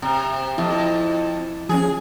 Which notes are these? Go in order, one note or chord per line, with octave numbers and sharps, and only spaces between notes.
C3
F2 E4
F3 C#4 G#4